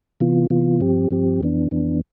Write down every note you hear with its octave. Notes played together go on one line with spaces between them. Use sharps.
C3 E3 B3 F4
C3 E3 B3 F4
G2 F3 C4 G4
G2 F3 C4 G4
F2 E3 B3 D4
F2 E3 B3 D4